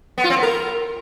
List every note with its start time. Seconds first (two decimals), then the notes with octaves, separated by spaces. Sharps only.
0.18 B3
0.24 F4
0.30 C4
0.36 B3
0.43 A#4